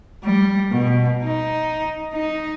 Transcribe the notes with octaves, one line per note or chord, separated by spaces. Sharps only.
G3
B2
D#4
D#4